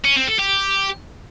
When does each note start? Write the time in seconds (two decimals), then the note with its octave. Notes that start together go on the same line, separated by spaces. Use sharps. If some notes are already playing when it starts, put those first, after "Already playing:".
0.04 C#4
0.16 C4
0.27 A4
0.39 G4